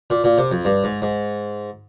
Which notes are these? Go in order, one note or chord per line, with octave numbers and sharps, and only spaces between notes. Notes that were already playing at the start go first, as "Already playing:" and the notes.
A#2
A#2
C3
F2
G2
G#2
G#2